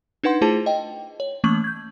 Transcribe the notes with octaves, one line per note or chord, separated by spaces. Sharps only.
D4 D#4 B4 F#5 C6
A3 E4 F4 G#4 C5 A5
D#5 G5
C#5
E3 A3 A#3 C#4 C#6 F#7
G6 G#6